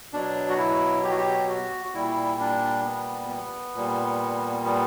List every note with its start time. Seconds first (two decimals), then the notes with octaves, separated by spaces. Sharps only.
0.13 B2 F#3 D4
0.49 F#4
0.58 E4
1.04 G4
1.11 F#4
1.18 G4
1.49 F#4
1.85 F#4
1.94 A#2 G3 E4
2.40 D4
2.85 B3
3.29 B3
3.75 A#2 G3
4.65 B3